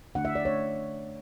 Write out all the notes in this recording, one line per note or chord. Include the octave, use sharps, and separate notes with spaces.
D3 A3 D4 F#5
E5
D5
D3 A3 D4 C#5